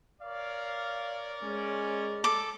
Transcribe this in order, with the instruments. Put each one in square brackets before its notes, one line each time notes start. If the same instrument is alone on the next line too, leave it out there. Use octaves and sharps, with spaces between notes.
[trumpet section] A#4 C#5 D5 [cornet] F5
[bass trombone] G#3 [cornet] C#4
[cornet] A4 [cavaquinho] D6